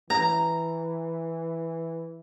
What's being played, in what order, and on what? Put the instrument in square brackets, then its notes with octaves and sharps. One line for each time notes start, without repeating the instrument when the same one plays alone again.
[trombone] E3 [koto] A#5